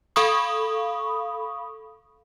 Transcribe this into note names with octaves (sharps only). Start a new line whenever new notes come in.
A4 F5 B5 C#6 D#6